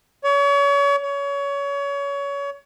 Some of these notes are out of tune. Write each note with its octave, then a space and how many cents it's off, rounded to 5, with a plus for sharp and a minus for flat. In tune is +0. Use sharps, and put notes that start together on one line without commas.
C#5 +35
C#5 +25